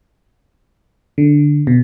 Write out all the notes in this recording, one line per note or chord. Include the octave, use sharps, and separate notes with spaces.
D3
B2